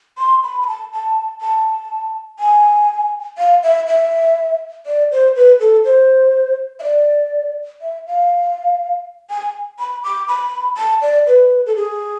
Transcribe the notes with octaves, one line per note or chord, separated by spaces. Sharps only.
C6
B5
B5
A5
A5
A5
G#5
F5
E5
E5
D5
C5
B4
A4
C5
E5
D5
E5
F5
G#5
B5
D6
B5
A5
D5
B4
A4
G#4